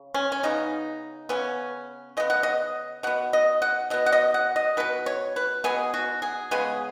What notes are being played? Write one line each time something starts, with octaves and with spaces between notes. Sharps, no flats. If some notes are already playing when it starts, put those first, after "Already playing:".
Already playing: C#3
C#4
C#4
C#3 B3 D#4
C#3 B3 C#4
C#3 B3 D#5
F#5
D#5
B2 B3 F#5
D#5
F#5
B2 B3 D#5
F#5
D#5
F#5
D#5
B2 B3 B4
C#5
B4
B2 B3 G#4
F#4
G#4
C#3 G#3 B3 G#4